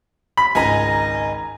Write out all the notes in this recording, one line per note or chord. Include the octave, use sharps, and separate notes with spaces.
B5
G#1 C#2 D#5 G#5 A#5